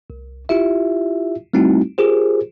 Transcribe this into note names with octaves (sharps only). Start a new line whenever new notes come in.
C2
E4 F4 G4 E5
G3 A3 C4 D#4 E4 F#4
F4 G4 G#4 A#4 C5